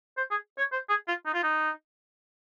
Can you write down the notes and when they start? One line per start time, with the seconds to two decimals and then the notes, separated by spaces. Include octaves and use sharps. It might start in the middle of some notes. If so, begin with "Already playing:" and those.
0.17 C5
0.31 G#4
0.58 C#5
0.72 C5
0.89 G#4
1.08 F4
1.26 D#4
1.34 F4
1.43 D#4